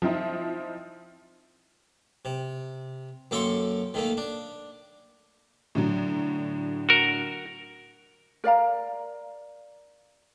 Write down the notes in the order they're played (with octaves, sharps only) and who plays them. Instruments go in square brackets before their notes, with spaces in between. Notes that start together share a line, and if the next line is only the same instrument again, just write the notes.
[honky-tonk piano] F3 C4 D#4 E4
[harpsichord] C3
F#2 A#3 A4 G5 C6 C#6
D#3 A3 A#3
D4
[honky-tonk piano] A2 D3 F#3
[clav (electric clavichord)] F#4 A#4
[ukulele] A#4 D5 F5 A#5